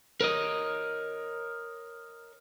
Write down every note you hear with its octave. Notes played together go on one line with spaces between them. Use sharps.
A#4 C#5 D#5